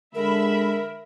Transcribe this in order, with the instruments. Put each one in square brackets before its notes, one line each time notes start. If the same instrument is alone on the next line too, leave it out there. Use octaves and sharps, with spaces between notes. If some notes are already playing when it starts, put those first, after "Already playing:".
[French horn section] D3 G#3 [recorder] A#4 [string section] E5 B5